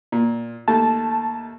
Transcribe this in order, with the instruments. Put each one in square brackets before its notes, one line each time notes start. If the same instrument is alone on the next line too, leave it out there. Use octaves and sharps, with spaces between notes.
[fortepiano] A#2
[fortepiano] D#2 A3 [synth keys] A5